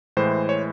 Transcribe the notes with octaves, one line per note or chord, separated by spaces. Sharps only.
A2 E3 G#3 C5
C#5